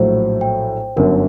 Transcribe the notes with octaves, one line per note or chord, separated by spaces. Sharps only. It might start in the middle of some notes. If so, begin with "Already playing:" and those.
Already playing: A#1 A2 F#3 C5
G5
G1 F#2 D3 A#4